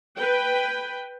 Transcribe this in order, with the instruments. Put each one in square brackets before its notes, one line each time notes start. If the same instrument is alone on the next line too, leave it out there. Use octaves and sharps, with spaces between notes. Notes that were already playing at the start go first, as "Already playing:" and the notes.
[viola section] B4 G5